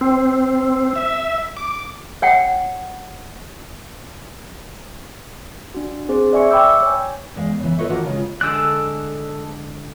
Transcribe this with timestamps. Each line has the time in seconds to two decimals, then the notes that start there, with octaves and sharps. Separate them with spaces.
0.01 C4
0.96 E5
1.57 D6
2.22 C#5 F#5 G5
5.74 D4 F#4
6.09 C4 G#4 C5
6.33 D5 E5 G#5 C#6 C#7
6.51 G5 B5 C#6 D6 E6 G6
6.82 C#5 G#5
7.36 E2 G#3 F5
7.60 C#3 E3
7.78 F4 A4 B4 C#5 D#5 E5
7.89 D#3 A#3 B3 D4 F#4 C#5
8.05 C#3 G#3 F4
8.41 D3 G#3 A4 D5 E6 F#6